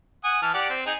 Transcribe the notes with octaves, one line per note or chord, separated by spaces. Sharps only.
F#5 G#5 D#6
E3 A5 F6
G4 D5 F#5
C4
D#4 G#4